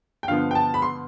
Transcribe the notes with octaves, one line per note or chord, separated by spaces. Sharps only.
G5
G2 D3 F3 B3 F5
G5
A5
B5
C6